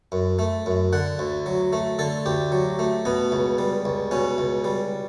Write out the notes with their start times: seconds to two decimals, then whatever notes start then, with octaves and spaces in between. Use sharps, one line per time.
0.12 F#2
0.39 A3
0.66 F#2
0.93 D3 F#5
1.19 D2
1.46 F#3
1.73 A3
1.99 D3 A4
2.26 D2 G4
2.52 F#3
2.79 A3
3.05 B2 B3
3.32 C#2
3.58 G3
3.85 C#2
4.11 B2 C#4
4.38 C#2
4.64 G3